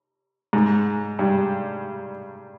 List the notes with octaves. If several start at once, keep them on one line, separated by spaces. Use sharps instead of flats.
G#2
G2